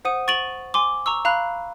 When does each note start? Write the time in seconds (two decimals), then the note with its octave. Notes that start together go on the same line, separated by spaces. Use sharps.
0.05 C5 F#5 D#6 D#7
0.28 C#6 A6 D7 D#7 F7 F#7
0.74 G#5 C6 D6
1.06 A#5 C#6 E6
1.25 F5 A#5 B5 F#6